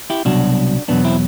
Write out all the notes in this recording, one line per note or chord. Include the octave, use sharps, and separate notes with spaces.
E4 G4
C2 B2 F#3 D4 F#4
E2 B2 F#3 B3 D4
C4 E4